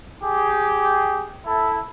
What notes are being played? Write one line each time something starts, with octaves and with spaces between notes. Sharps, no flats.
G4 G#4
E4 A4